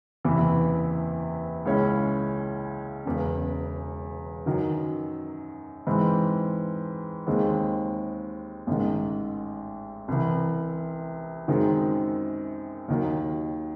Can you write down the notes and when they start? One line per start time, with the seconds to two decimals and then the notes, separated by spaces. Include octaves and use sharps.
0.25 F#1 E2 C3 E3
1.65 C#2 C#3 G#3 C#4 E4
3.05 E1 E2 C#3
4.46 F#2 D#3 F#3
5.87 G#2 E3 C4
7.27 D#2 D#3 G#3 C4
8.67 A1 G#2 D#3
10.08 C2 C3 E3
11.48 F#2 D#3 G#3 C4 D#4
12.88 D#2 D#3 F#3